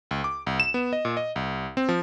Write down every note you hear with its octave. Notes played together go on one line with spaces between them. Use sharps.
C#2
D6
C2
E7
B3
D#5
A#2
D#5
C2
C4
F3